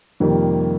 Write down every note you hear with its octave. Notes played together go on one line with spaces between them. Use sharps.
F2 C3 D#3 G3 A#3